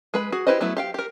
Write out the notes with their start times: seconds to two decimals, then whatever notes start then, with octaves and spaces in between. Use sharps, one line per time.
0.14 G#3 B4 B5
0.32 F#4 G#4
0.47 E4 G4 B4 C5 D#5
0.61 F#3 A3 B3 E4
0.77 G4 F5 G5
0.94 G4 A#4